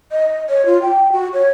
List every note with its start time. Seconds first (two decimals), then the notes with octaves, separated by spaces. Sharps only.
0.12 D#5
0.49 C#5
0.66 F4
0.82 G5
1.12 F#4
1.33 C#5